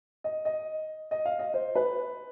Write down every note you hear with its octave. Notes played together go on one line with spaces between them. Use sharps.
D#5
D#5
D#5
F5
D#5
C5
B4